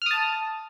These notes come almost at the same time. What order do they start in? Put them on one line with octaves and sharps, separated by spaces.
F6 D#6 A5